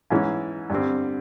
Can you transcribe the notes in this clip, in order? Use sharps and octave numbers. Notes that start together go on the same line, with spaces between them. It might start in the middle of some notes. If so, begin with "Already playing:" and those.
G#2 E3 G#3 C#4 E4
G2 D3 G3 C4